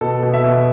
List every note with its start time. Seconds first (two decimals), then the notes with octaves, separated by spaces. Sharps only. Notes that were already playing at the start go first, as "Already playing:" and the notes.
0.01 B2 A4
0.23 B2
0.34 E5
0.44 B2